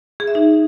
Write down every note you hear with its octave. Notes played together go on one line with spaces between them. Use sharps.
G#4
E5
D#4